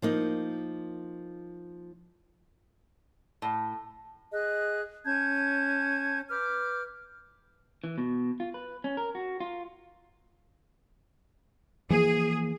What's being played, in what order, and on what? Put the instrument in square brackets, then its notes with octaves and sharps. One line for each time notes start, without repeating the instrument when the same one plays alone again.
[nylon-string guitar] F3 A#3 D#4
[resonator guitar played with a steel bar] A2
[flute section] G#4 D#5 F#6
C#4 A5 G6 G#6
B4 D6 F6 G6
[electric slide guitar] E3
B2
F4
B4
C#4
A#4
F#4
F4
[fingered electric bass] E3 F3 A#3 [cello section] G#4